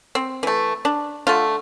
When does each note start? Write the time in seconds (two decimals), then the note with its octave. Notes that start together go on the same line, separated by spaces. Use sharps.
0.15 C4
0.43 E3 A3
0.85 D4
1.27 D3 A3 F4